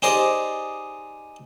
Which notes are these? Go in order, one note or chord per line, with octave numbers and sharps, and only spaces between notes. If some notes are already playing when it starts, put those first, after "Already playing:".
D#4 G4 G#4 C5 D5 D#5